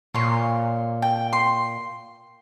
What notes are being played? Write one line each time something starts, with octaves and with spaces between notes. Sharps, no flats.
A#2 C#5 C6
G5
C6